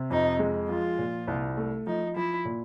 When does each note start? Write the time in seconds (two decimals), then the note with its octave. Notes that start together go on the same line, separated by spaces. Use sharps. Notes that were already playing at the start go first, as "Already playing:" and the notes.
Already playing: C3
0.10 F2 D#4
0.39 G#3
0.69 F3 F4
0.98 A#2
1.28 C2
1.57 A3
1.86 F3 D#4
2.16 F3 E4
2.45 A#2